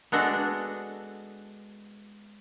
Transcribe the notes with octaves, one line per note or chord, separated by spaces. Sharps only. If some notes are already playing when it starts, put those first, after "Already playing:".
G#3 B3 D4 F#4 A4